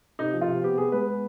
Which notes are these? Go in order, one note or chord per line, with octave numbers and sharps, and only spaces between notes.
C3 D#4
F3
F4
C3
B3 G4
B3 G#4
G#3 B4
B3